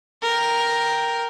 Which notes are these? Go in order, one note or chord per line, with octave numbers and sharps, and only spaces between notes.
A#4 G5